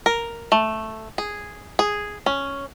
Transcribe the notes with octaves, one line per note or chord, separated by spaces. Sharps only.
A#4
A3
G#4
G#4
C#4